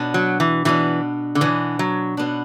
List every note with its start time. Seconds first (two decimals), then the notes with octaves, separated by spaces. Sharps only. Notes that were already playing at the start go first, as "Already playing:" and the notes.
Already playing: B2 B3 D4
0.14 F#3
0.40 E3
0.65 B2 E3 B3 D4
1.35 D3
1.41 B2 E3 B3 D4
1.79 F#3
2.17 B2 B3 D4